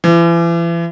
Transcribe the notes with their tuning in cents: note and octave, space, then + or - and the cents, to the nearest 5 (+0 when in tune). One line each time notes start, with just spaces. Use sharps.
E3 +40